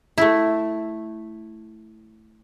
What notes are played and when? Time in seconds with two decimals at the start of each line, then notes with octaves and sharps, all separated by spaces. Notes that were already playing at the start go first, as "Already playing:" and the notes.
0.18 A3 E4